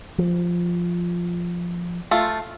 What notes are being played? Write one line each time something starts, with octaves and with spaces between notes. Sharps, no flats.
F3
A3 F4